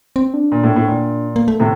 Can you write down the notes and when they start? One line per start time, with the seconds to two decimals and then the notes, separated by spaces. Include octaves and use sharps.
0.16 C4
0.34 D4
0.52 A#2
0.64 A2
0.76 A2
0.88 A#2
1.36 A#3
1.48 A3
1.60 A2 C3